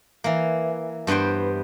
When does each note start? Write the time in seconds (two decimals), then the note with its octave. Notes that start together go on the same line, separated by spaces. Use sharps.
0.24 E3 A#3
1.07 G2 B3 B4 C5 G5